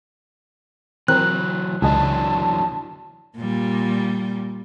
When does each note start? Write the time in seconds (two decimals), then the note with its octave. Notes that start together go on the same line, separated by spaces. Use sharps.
1.08 E3 F#3 C4 A#4 C5 F#6
1.82 C#2 E3 F#3 D4 G#4 D#5 A5
3.37 A#2 G3